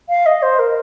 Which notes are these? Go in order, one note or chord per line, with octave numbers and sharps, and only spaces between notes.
F5
D#5
C5
A#4